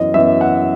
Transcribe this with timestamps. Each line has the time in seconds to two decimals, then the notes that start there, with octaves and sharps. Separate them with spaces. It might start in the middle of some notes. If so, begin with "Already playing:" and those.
Already playing: F#2 E3 B3 D#5
0.14 F#2 E3 B3 E5
0.41 F#5